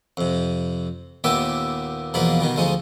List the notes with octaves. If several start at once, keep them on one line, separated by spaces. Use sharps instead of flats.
F2 C3
D#2 A#2 B3 G4 E5 D6
E2 B2 F3 A#3 B5
B2 D#3 G3
D2 F3 G#3 D#4